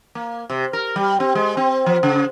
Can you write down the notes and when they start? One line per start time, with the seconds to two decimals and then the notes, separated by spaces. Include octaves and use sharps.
0.15 A#3
0.50 C3
0.73 A#4
0.96 G3
1.20 C4
1.35 G#3
1.57 C4
1.86 F3
2.03 C#3